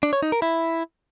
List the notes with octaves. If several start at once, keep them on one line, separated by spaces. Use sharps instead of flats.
D4
C#5
D#4
A#4
E4